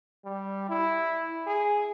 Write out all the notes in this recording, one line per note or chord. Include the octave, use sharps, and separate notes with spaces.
G3
E4
G#4